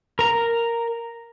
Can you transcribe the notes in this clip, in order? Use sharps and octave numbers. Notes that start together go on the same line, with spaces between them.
A#4 A#5